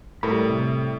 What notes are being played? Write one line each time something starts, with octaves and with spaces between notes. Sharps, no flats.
A2 G3 A4 A#4 B5
C3